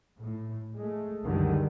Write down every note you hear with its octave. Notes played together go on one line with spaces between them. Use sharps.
A2
G#3 A3
C#2 F#2 D3 D#3 F#3 G3